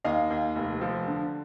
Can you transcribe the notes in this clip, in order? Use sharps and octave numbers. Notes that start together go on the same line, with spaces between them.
D#2 D#5 F5
D#2
F1
F3
D3